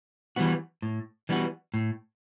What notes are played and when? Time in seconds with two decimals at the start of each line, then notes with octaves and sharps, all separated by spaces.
0.36 E3 G3 B3 F#4
0.82 A2
1.29 E3 G3 B3 F#4
1.74 A2